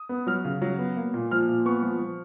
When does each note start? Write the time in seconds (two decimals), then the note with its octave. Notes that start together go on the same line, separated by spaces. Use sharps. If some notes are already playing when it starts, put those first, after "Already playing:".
Already playing: D#6
0.09 B3
0.27 F#3 F6
0.45 C#3
0.62 F#3
0.78 B3
0.96 A#3
1.14 A#2
1.31 F3 F6
1.49 A#2
1.65 B3 C#6
1.82 F3
2.00 F3